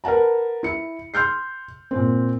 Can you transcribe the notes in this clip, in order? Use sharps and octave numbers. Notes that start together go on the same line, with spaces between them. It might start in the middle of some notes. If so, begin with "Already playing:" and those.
A#4 B4 F#5 A5 A#5
E4 C#7
C6 F6 G6 C7
A#2 C4